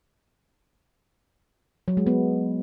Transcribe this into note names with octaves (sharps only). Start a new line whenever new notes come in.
F#3
G#3
B3